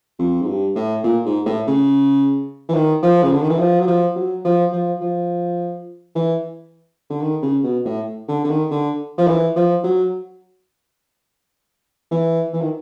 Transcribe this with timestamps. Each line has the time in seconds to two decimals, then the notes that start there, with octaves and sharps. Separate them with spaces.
0.19 F2
0.42 G#2
0.47 G2
0.75 A2
1.04 A#2
1.25 G#2
1.46 A2
1.67 C#3
2.69 E3
2.74 D#3
3.02 F3
3.23 C#3
3.32 D3
3.42 D#3
3.50 E3
3.59 F3
3.80 F#3
3.88 F3
4.16 F#3
4.45 F3
4.73 F3
5.01 F3
6.15 E3
7.10 D3
7.21 D#3
7.42 C#3
7.64 B2
7.85 A2
8.28 D3
8.44 D3
8.49 D#3
8.71 D3
9.18 F3
9.28 E3
9.56 F3
9.84 F#3
12.11 E3
12.53 E3
12.61 D#3